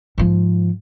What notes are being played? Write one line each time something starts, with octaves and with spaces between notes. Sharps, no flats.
G#2 F3